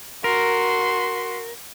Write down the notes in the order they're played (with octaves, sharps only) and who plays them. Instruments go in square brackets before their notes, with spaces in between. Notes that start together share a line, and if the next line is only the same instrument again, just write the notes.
[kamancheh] F#4 C6 [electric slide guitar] A#4